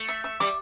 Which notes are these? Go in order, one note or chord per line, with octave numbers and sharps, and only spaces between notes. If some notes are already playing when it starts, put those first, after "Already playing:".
Already playing: A3
E5
E5
G3 D6